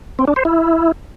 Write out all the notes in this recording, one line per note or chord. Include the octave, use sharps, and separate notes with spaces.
C4
D4
C5
E4